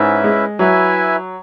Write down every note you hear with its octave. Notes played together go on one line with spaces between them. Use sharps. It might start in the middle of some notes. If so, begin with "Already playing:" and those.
Already playing: G#2 C#4 E4 B4 E5
G#3
F#3 E4 B4 E5 G#5